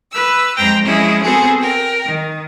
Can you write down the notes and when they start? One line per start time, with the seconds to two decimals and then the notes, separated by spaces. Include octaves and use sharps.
0.11 B4 E6
0.56 F2 G#3 C5 G5 A#5
0.84 F3 G#3 C#4 E4 G#4 D#5
1.22 B3 C4 F#4 G#4 A4 C5
1.59 A#4 G5
2.06 D#3